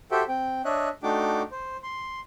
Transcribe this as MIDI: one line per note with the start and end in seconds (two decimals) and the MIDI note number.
0.11 0.23 66
0.11 0.23 67
0.11 0.23 69
0.11 0.23 72
0.11 0.23 76
0.11 0.23 79
0.28 0.62 60
0.28 0.62 79
0.65 0.89 62
0.65 0.89 73
0.65 0.89 75
0.65 0.89 76
0.65 0.89 90
1.03 1.42 57
1.03 1.42 62
1.03 1.42 63
1.03 1.42 66
1.03 1.42 79
1.03 1.42 86
1.51 1.77 72
1.83 2.20 84